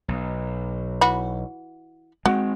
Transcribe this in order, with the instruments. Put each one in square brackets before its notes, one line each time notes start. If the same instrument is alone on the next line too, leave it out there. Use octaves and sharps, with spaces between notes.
[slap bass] B1
[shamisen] E3 F#4 B5
[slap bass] G#3 A3 C4 [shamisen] F#4